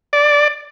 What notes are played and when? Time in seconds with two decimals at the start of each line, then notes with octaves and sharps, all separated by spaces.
0.13 D5